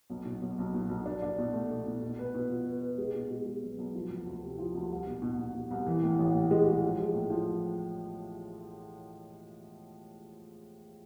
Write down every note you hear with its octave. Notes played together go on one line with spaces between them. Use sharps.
B1
B2
B1
B1
B2
B1
D4
D4
B2
A3
B2
B2
B2
B4
B2
F4
B4
B4
G#3
B2
G#3
G#3
B1
B1
F3
D2
D2
C3
F3
D2
C2
B2
B2
B2
B2
C2
E3
A2
A1
A2
G#3
G#3
F3
G#3
A2
F3